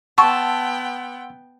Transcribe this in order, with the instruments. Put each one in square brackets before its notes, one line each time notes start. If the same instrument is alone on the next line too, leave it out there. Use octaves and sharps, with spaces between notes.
[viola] B3 G5 [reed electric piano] F#5 C6 E6 [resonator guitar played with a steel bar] A5 [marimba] C#6